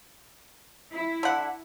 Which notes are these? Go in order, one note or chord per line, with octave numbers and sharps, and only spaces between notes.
E4
D3 F#5